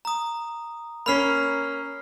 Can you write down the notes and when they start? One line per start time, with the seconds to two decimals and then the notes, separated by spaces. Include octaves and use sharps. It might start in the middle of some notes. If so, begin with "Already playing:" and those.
0.05 A#5 D#6
1.06 A#3 C#4 B5 F6 C7